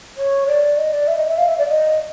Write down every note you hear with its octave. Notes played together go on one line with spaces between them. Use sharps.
C#5
D5
D#5
D5
E5
D#5
E5
F5
E5
D5
D#5